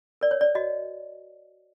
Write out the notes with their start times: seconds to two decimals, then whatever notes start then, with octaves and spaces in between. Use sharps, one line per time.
0.21 A#4 D5
0.31 C#5
0.41 D5
0.55 F#4 D#5